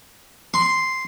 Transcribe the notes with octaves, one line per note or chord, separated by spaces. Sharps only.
C6